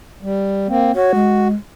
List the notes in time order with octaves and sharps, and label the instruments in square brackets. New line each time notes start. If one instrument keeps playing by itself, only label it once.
[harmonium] G3
A#3 C4
[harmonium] F#4 [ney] C#5
[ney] G#3